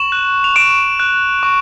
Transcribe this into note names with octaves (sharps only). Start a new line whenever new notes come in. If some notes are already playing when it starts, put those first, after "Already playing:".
Already playing: C#6 E7 F#7
F#6
F7
C#6 D7 E7
F#6
C#6